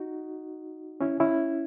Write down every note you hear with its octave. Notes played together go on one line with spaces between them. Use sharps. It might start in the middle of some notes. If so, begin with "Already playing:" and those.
Already playing: D#4 F#4
C#4 E4
C#4 E4